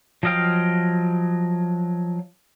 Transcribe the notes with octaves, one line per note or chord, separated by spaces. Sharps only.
F3 F#3 D#5 F5 G5